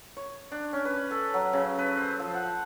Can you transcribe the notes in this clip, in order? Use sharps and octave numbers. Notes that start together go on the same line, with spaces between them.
C#5
D4
C#4
B4
A4
F#3
C#3
B4
C5
F3
F#5